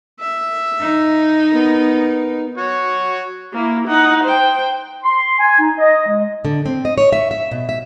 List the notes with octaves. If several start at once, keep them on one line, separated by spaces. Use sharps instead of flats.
E5
D#4
B3 A#4
F#4 C#5
A#3 E4
D#4 F#5
C5 G5
C6
G#5
D#4
D#5
G#3
D3
C4
D#5
C#5
E5
E5
B2
E5